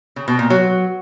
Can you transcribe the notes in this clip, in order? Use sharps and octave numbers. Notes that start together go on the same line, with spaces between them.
C#3
B2
A#2
F#3